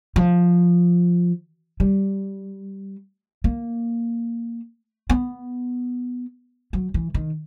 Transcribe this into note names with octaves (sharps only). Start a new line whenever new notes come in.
F3
G3
A#3
B3
F#3
E3
D#3